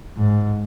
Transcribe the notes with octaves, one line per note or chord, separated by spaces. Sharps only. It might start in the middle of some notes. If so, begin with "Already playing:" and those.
G#2